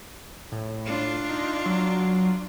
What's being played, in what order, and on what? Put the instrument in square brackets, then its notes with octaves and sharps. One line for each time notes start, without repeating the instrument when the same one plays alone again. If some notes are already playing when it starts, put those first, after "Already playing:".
[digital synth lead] A2
[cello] D4 F4
[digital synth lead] D#4
F#3